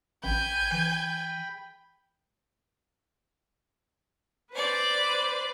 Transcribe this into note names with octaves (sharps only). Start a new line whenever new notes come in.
A1 G5 G#5 B5 G6
E3
B4 C5 D5